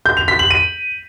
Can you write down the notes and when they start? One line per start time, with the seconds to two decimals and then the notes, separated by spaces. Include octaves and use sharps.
0.06 G6
0.17 F7
0.28 B6
0.39 F#7
0.50 D#7